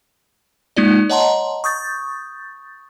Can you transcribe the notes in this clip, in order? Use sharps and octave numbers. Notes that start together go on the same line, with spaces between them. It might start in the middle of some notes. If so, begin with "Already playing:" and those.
G#3 A#3 D#4 F4 D5
C#5 D#5 F#5 A5 A#5 C6
C#6 D#6 G6 A6